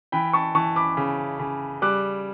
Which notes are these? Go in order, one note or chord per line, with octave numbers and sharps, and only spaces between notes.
E3 G5 B5
A5 C#6
E3 A5 C#6
B5 D6
C#3
C#3
G3 D6 F#6